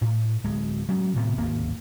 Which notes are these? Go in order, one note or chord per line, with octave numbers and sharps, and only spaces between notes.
A2
D1 G#3
F#3 G#3 A3 C#4
A2 C3 D#3 B3
D1 G#1 D#2 A#3